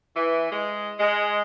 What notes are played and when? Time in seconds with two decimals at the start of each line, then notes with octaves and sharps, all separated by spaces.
0.16 E3
0.51 G#3
1.00 G#3